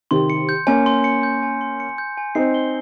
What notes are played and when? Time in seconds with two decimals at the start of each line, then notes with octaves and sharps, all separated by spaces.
0.11 C3 D#3 C6
0.30 C#7
0.49 G6
0.67 A#3 C#4 G#5
0.86 C6
1.04 C#7
1.23 G6
1.43 G#5
1.61 C6
1.80 C#7
1.98 G6
2.17 G#5
2.35 C4 D#4 C7
2.54 G7